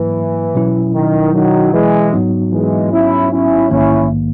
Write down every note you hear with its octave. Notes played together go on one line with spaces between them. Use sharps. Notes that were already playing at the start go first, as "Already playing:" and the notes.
Already playing: G#2 E3 F#3 A#3 E4
B2 F#3 C#4 E4
D#3
D#3 F#3
E3 G#3
G#2 F#3 B3 D#4 F#4
E3 G#3
C#4 E4
C#4 E4
A#1 G#2 D#3 A#3 C#4 E4